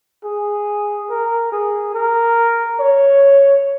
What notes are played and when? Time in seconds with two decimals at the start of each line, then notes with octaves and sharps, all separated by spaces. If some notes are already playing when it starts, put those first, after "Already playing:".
0.24 G#4
1.10 A#4
1.52 G#4
1.94 A#4
2.80 C#5